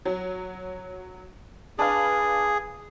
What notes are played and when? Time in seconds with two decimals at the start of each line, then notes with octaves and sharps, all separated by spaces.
0.05 F#3
1.79 D4 G#4 B4 F5